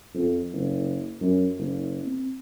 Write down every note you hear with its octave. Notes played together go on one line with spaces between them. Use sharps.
F2
F#1
F#2
F#1
C4